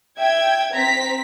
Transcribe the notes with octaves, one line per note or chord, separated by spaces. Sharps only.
E5 G5 G#6
C4 A#5 B6